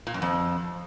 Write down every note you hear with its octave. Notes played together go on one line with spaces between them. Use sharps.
A#2
F#2
F2